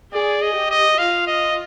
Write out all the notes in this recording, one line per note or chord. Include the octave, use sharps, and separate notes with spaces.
G#4 D5
D#5
G4
D#5
F4 F5
D#5